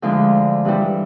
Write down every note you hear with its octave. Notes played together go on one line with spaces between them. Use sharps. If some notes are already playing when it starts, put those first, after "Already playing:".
D2 D3 F3 G#3 C5
G2 E3 G3